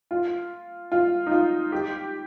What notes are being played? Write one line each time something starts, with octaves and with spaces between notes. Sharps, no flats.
F4
F4
D#4
F4
G4